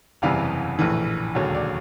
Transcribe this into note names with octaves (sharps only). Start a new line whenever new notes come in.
F#1 E2 C3 E3 G3 F5
A#1 A2 E3
E1 D#2 D3 F#3 C#5
D5